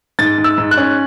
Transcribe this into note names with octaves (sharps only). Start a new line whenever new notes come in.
G#2 A6
G#2
E6
G#2
F#6
C#4